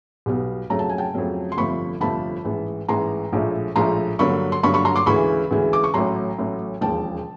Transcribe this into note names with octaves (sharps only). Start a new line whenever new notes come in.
B1 B2 G3 B3
F2 C#3 F#3 A3 A#5
A5
G#5
G5 A5
F2 C#3 F#3 A3
C6
G1 F2 C3 F3 A3 B5 C#6
G1 F2 C3 F3 A3 A5 B5
A1 G#2 E3
A1 G#2 E3 A#5 C6
A#1 A2 F3 G#3
A#1 A2 F3 G#3 A#5 C6
G2 D3 F#3 A#3 B5 C#6
C6
G2 D3 F#3 A#3 B5 C#6
B5 C#6
A#5 C6
C6 D6
D2 C#3 E3 G#3 B5 C#6
D2 C#3 E3 G#3
D6
C#6
A1 A2 F#3 A#5 C6
A1 A2 F#3
E1 D#2 C#3 F3 G5 A5